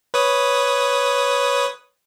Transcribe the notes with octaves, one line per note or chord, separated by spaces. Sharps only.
B4 C#5 D#6